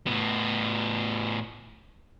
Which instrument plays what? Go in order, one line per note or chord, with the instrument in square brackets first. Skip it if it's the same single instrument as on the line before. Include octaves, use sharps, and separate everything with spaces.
[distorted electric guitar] A2 B3